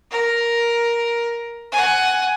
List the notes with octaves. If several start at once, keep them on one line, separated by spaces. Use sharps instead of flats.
A#4
F#5 G#5